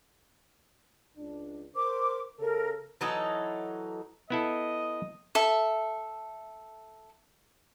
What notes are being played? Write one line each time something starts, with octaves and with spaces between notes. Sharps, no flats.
C#2 D4
A#4 C5 D6
C#3 A4 A#4
E3 F#3 D#4 A4
B3 E4 A4 D#5
A4 E5